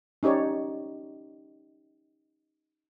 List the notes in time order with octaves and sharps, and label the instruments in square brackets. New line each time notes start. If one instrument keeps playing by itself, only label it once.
[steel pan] C#4 D#4 G4 C#5 D5